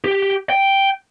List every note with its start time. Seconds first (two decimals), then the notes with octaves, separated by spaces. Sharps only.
0.04 G4
0.50 G5